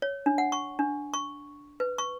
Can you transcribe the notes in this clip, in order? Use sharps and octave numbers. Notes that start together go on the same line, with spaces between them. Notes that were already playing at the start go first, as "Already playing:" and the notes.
C#5
D4
F#5
C#6
D4
C#6
B4
C#6